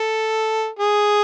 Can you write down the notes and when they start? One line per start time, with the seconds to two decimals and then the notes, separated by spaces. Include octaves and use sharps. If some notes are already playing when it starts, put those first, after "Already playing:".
Already playing: A4
0.79 G#4